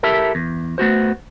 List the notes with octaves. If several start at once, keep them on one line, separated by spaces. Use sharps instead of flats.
E4 G4 A4 A#4 E5
E2
A3 B3 F#4 C5